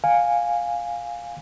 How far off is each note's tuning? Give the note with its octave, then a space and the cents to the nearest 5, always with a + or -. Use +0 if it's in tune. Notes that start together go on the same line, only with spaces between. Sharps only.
F5 +10 G#5 -10